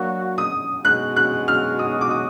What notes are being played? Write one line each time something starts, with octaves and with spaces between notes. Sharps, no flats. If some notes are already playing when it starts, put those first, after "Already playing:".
Already playing: F#3 A#3 D4 F#4
D#6
B2 G#3 D#4 F#4 F#6
F#6
F6
D#6
D6
D#6